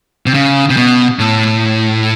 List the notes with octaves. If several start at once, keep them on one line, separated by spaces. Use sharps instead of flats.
C3
C#3
C3
B2
A2